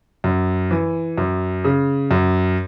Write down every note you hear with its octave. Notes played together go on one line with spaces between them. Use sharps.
F#2
E3
F#2
C#3
F#2